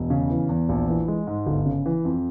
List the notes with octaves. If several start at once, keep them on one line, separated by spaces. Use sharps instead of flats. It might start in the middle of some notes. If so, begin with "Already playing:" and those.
Already playing: E1
C#3
E3
E2
A#1
E3
G#3
G#2
G1
C#3
E3
F2